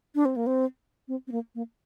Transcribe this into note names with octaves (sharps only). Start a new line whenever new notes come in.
D4
C4
A#3
C4
C4
C4
A#3
A#3